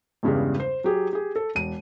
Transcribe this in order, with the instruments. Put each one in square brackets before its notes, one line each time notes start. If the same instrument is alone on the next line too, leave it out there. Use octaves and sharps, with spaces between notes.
[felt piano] E2 G2 C#3 G3 G#3
C5
F#3 G4 G#4
G4 G#4
A4
E1 D#7